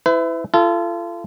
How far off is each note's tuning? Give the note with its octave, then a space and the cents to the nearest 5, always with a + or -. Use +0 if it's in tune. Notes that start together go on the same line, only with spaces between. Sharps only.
E4 +0 B4 +40
F4 -35 A4 +0